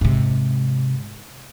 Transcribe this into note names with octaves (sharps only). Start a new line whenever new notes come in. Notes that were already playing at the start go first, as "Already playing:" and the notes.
G#2 C3